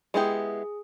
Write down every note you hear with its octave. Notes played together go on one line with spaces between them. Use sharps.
G#3 B3 E4 G4 G#4